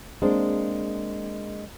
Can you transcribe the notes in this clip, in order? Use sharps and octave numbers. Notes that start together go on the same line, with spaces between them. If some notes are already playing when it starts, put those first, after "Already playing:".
G#3 A#3 C4 D4